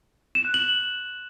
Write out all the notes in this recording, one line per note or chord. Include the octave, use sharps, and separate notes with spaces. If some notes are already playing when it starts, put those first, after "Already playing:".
E7
F#6
F#7